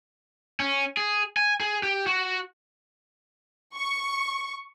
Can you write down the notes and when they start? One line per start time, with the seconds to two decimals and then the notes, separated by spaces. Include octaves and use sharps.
0.60 C#4
0.97 G#4
1.37 G#5
1.60 G#4
1.83 G4
2.07 F#4
3.76 C#6